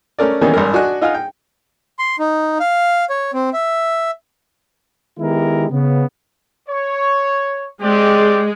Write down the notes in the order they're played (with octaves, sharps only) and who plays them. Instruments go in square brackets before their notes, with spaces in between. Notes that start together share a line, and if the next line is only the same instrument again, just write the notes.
[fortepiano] A3 C#4 A#4 D5
D#3 E3 G3 A#3 B3 C#4
G#1 G2 A#4
D4 F#4 D#5 G#5 F#6
D#4 F4 F#5 G#5 F6
G5
[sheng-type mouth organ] C6
D#4
F5
C#5
C4
E5
[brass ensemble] D#3 G#3 B3 E4 G4 A#4
C#3 B3
[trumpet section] C#5
[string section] G#3 [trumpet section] C4 G4 D5